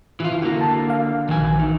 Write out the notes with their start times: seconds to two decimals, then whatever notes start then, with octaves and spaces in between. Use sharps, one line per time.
0.20 E3 E4 F4
0.42 D3 A#3 F#4
0.61 A5
0.90 F5
1.28 A#1 D#3 F#3 G#5
1.56 E3 D#4